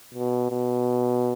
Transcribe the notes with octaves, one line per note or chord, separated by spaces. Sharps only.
B2
B2